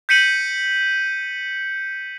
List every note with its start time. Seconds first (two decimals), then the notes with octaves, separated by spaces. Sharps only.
0.09 G6 B6 C#7 D#7 F#7